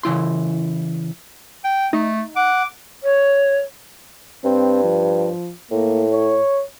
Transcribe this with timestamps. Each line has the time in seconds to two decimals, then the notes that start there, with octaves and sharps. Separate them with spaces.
0.03 C#3 E3 E4 C6
1.64 G5
1.93 A3 D#4
2.36 F#5 D6
3.03 C#5
4.44 G2 C4
4.83 F3
5.71 A2 A#3
6.12 C#5